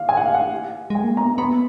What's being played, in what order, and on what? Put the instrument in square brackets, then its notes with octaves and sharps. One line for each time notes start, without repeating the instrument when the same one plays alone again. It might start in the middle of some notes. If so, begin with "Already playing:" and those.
Already playing: [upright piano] F5
G#5
F#5
F5
F#5
[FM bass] G#3 [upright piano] G#5
[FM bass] A#3
[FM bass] B3 [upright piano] A#5
[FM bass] B3 [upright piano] B5